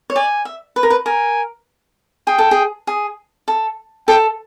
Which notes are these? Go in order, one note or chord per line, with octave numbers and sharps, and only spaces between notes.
C#5
D5 G#5
E5
B4
A#4
B4
A#4 G#5
G#4 G5
A4
G#4
G#4
A4
A4 G5